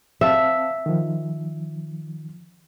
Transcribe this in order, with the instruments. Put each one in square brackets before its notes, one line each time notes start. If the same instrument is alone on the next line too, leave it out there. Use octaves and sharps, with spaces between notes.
[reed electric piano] C4 F5 A5 [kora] E5
[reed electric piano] D#3 F3